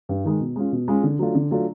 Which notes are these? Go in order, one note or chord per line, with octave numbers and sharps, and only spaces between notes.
G2
D#3 G#3
B2
G#3 C#4 F4
B2
G#3 C#4 F4
D3
F#3 A3 D4 F4
D3
F#3 A3 D4 F4